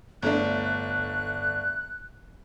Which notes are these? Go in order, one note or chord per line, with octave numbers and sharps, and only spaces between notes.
G1 A3 D4 F#6